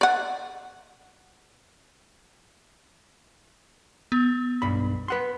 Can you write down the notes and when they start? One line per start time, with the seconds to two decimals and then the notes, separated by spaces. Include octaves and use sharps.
0.01 D5 F#5
4.12 B3
4.62 B1 G2 B5
5.08 B4 F#5 C6